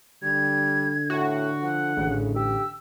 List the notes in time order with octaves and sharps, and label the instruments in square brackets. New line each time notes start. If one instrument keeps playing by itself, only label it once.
[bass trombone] D3 [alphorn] G3 [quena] G#6
[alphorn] A2 [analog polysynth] F#4
[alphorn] F3 [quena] F#5
[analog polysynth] A1 [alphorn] C#3
[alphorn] G4 [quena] E6